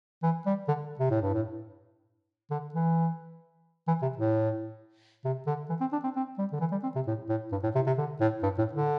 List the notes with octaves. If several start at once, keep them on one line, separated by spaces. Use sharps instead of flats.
E3
G3
D3
C3
A2
G2
A2
D3
E3
E3
C3
A2
C3
D3
E3
C4
D4
C4
C4
G3
D3
E3
G3
C4
C3
A2
A2
G2
A2
C3
C3
D3
A2
G2
A2
D3